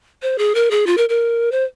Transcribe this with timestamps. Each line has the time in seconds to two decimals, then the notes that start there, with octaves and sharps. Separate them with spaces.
0.22 C5
0.38 G#4
0.55 A#4
0.71 G#4
0.87 F4
0.97 A#4
1.09 A#4
1.52 C5